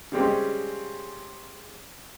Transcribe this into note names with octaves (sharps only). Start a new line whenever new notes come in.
C#3 G3 G#3 C4 C#4